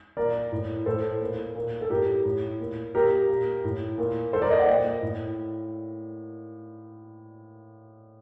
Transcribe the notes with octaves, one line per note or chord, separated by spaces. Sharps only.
A#2 A#4 D5
A2
A2 A4 C5
A#2
A#2
A4
A2 G4 A#4
A2
A#2
A#2 G4 A#4
A#2
A2
A#2
A#2 A4 C5
A#4 D5
C5 D#5
D5 F#5
A#2 D#5 G5
A2